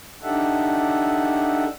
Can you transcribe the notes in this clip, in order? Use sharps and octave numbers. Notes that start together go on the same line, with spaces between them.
D4 D#4 G4 A4 E5 F#5